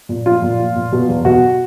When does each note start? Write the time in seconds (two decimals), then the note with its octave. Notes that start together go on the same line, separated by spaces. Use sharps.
0.09 A#2
0.26 F3 F4
0.42 A#2
0.59 F3
0.75 A#2
0.92 B2
1.09 E2
1.25 B2 F#4